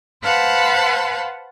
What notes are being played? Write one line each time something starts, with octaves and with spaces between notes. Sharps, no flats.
B4 C5 F5 F#5 A5 B5